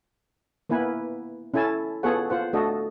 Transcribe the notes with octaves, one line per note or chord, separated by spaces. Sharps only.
A#3 B3 E4 B4 G#5
C#4 E4 A4 G#5 A5
B3 F4 G#4 A4 C#5 F#5
F4 C5 F#5
A3 D4 F#4 A4 D#5